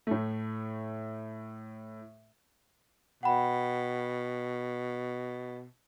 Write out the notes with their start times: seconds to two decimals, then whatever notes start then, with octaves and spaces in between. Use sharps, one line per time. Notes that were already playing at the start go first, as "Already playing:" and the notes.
0.07 A2 A3
3.23 B2 F#5 G5 B5